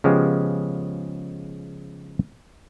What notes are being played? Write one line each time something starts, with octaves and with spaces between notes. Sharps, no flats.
C#3 F3 G#3 B3 G4